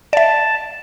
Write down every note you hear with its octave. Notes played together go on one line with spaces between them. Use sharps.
D5 E5 A5